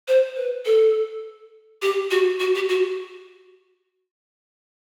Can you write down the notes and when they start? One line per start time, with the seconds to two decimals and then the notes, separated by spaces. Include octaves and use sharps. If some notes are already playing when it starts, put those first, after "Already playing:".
0.08 C5
0.36 B4
0.65 A4
1.82 G4
2.11 F#4
2.40 F#4
2.55 G4
2.69 F#4